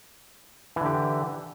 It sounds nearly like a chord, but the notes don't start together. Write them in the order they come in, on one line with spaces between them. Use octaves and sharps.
E3 D3 G4